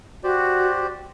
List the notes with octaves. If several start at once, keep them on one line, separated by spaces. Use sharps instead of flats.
F#4 G4 C5 D5